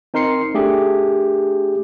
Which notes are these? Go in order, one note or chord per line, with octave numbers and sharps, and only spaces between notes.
C4 D#4 A#4 C6 C7 C#7
A3 D4 G4 G#4